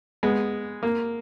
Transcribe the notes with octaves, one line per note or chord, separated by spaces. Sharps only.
G#3 B3
A#3